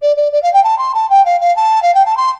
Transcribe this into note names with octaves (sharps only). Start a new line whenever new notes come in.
D5
D5
D5
F5
G5
A5
C6
A5
G5
F5
F5
A5
F5
G5
A5
C6